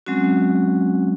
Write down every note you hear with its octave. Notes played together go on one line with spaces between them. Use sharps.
F#3 G#3 C4 C#4 F#4